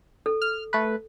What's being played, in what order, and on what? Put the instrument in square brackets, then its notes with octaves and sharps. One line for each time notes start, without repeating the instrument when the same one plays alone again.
[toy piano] A4
[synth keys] F6
A3 B4